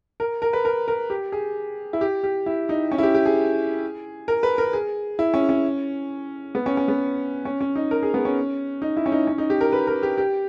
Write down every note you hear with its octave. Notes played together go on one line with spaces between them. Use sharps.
A#4
A#4
B4
A#4
A#4
G4
G#4
E4
G4
G4
E4
D#4
C#4
E4
G4
G4
G#4
A#4
B4
A#4
G#4
E4
C#4
C#4
B3
C#4
C#4
B3
C#4
C#4
D#4
A#4
G#4
B3
C#4
D#4
E4
C#4
D#4
C#4
D#4
G4
A#4
B4
A#4
G4
G4